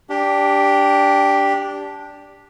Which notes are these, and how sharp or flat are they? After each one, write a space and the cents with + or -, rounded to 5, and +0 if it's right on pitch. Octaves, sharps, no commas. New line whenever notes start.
D4 -10 G4 +5